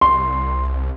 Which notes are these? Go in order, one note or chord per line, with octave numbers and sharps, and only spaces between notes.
C2 C6